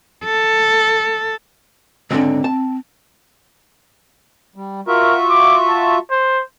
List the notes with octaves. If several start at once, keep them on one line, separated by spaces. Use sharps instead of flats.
A4
C#2 G#2 D3 C4
A5
G3
F4 F#4 A#4 E5
D6
A5
C5